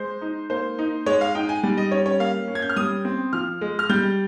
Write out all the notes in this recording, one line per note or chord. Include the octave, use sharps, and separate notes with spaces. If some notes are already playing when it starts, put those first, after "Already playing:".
Already playing: G#3 C5
D#4
A#3 C5
D#4
G#3 C#5
F5
D#4 G5
G#5
G3
D#5
C#4 C#5
C#5
A#3 F5
C#4
G#6
G6
F6
G3 D#6
C4
F3 F6
G#3
F6
G3 G6